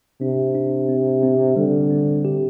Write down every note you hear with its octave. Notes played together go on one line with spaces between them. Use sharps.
C3 D4
D4
C4
C4
D3 G3
C4
G4